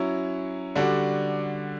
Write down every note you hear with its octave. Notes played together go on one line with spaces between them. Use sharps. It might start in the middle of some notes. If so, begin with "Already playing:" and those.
Already playing: F#3 C#4 E4
D3 G3 D4 F#4